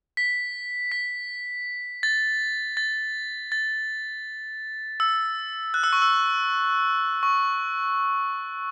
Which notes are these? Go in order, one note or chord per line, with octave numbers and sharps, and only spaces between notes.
B6
B6
A6
A6
A6
E6
F#6
E6
C#6
E6
C#6